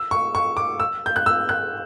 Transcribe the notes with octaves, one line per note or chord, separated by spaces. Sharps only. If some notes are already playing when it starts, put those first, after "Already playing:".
Already playing: E6
C#6
C#6
D6
E6
G6
F#6
E6
F#6